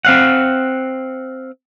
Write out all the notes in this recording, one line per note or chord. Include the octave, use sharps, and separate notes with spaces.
C4 F5 F#5